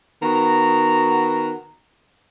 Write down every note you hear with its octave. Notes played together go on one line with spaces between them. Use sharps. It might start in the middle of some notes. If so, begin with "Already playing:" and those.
D#3 B3 F#4 A#5